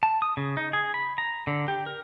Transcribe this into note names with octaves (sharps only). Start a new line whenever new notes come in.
A5
D#6
C#3
D#4
G#4
B5
A#5
D3
G4
A#4